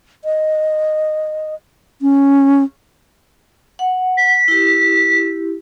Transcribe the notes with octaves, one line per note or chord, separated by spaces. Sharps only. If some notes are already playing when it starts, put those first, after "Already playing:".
D#5
C#4
F#5
B6
E4 G4